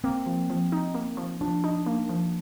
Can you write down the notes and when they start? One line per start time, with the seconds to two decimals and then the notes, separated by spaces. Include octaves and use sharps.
0.04 A#3 C4
0.26 F3
0.50 F3
0.72 D#4
0.95 A#3
1.17 F3
1.41 F3 D4
1.64 D#4
1.86 A#3
2.09 F3